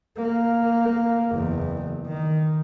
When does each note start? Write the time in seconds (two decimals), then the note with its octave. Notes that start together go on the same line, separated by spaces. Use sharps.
0.17 A#3
1.33 F#1 E2
2.07 D#3